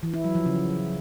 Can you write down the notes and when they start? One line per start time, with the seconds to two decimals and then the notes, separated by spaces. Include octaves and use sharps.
0.03 E3
0.14 E4
0.24 F#3
0.35 F3
0.46 C#3